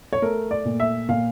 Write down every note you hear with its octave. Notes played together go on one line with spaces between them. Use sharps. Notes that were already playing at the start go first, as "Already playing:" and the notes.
C#5
A3 A#4
D5
A#2
E5
A#2 F5